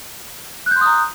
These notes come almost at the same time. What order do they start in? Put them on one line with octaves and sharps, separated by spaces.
F#6 G6 C6 D#6 A#5